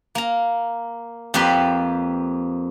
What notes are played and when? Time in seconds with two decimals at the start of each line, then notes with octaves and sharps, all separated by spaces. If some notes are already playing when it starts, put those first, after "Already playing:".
0.15 A#3 A#5
1.34 F2 A#3 G4 B4 C6